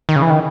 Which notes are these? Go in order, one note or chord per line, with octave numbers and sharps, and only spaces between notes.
D#3
C#3
E3
D#3